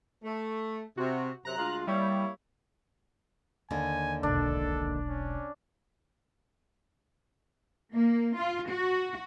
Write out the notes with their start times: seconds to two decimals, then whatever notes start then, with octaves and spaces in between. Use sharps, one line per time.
0.24 A3
0.97 C3 F#4
1.45 F#2 C3 A#5 F#6
1.57 D2 G#3 F4
1.87 G3 A#3 E4 C#5
3.71 D#2 D3 G#5
4.23 E1 B1 D4 A4
5.08 C#4
7.92 A#3
8.36 F4
8.69 F#4